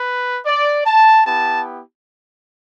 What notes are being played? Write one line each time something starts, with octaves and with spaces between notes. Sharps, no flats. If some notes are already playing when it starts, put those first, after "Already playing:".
Already playing: B4
D5
A5
B3 E4 G4 A5